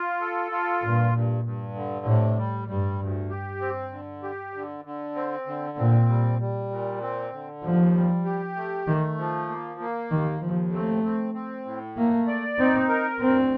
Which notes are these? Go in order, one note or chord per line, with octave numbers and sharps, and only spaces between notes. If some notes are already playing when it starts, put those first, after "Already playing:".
Already playing: F4
A4
F4
G2 A#2
G2
G2
D3
A2 C3
G3
G2 G3
D2
G4
C4
D3
G4
D3
D3
C4
D3
A#2 C4
G3
G3
A#2
C4
D3
D#2 F3
G3
G4
A3
D#3 A3
F3
A#3
A#3
D#2 D#3
D#2 F3
A3 C4
C4
C4
A2
A3 A#3
D5
C4 D#4
A#4
D2 C4